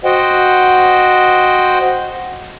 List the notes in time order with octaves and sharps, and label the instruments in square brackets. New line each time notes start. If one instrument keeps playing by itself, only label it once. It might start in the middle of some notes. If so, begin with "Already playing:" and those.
[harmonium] F#4 C5 D#5 F#5 G5